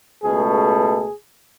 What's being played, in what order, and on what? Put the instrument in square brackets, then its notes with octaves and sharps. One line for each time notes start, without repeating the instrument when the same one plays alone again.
[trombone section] C#2 B2 A3 G#4
G#4